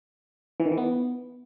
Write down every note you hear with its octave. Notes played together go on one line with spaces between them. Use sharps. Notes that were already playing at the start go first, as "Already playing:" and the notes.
E3
D#3
E3
B3